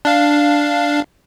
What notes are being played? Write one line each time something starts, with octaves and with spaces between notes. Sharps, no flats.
D4 F5